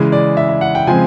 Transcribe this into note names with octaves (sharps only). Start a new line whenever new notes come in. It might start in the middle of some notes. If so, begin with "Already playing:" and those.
Already playing: C#3 E3 G#3
D5
E5
E5
F#5
G5
C#3 F3 G#3 C4 G#5